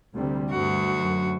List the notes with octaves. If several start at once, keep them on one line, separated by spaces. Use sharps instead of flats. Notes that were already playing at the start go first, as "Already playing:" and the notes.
D2 C3 G3
D2 G2 F#4
F#2